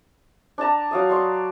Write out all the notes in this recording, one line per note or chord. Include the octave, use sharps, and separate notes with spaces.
D4 D5 A5 A#5
F#3 F5 D#6
D5 C6 C#6